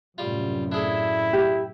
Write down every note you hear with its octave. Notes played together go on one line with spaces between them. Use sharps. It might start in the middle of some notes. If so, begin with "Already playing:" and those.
F#2 A2 C3 G3 F4
D4 E4 G#4 A4
G4